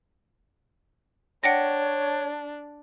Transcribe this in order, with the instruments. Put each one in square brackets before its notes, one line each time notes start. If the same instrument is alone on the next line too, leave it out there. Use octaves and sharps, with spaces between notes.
[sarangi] D4 [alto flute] C#5 [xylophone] F#5 G5 A#6